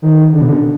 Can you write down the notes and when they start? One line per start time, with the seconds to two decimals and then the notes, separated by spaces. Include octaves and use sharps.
0.02 D#3
0.32 D3
0.41 B2
0.49 D3